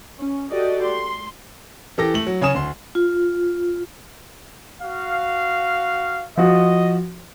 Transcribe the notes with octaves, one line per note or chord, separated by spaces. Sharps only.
C#4
F#4 G4 A4 D5 D#5
C6
E3 G4 A4 D6 A#6
A3 F#7
F#3
C#3 C#5 G#5 D#6 E7
D2 C6
F4
F#4 F5
F3 F#4 D#5